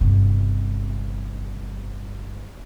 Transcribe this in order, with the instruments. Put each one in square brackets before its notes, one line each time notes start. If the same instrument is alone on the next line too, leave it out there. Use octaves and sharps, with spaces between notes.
[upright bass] G1 C3